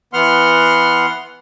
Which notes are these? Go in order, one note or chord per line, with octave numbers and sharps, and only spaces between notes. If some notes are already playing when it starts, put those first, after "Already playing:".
E3 B3 F#5 C6 F6